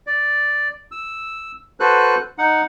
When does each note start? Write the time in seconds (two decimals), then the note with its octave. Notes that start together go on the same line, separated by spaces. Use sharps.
0.07 D5
0.91 E6
1.80 F#4 A4 B4 C5 F#6
2.38 D#4 F#5